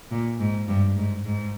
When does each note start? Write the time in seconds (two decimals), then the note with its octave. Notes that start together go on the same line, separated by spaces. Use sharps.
0.11 A#2
0.40 G#2
0.68 G2
0.97 G#2
1.25 G#2